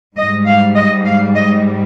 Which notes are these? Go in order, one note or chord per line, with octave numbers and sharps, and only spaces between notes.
G#2 G3 D#5
F5
D#5
F5
D#5